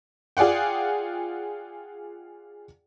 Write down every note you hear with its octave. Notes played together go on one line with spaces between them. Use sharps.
F4 G#4 D5 F#5 G5